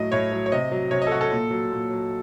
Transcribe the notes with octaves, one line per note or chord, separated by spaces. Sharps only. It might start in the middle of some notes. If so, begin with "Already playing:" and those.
Already playing: A2 F#3 D#5
A2 C#5
F#3
C#5
C3 D#5
F#3
C3 C#5
D#5
A4
F#3 F#4
A4
A#2
F#3
A#2
F#3